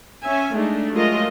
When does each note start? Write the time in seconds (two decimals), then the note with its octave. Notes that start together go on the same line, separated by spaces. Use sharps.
0.23 C#4 E5 G#5
0.53 G#3 A3 D4 D#4
0.92 F#3 G#3 A3 F4 A#4 D#5